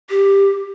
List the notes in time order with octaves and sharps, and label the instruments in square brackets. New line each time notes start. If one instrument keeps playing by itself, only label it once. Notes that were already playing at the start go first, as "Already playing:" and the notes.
[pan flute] G4